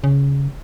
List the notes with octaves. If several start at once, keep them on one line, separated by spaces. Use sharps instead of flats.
C#3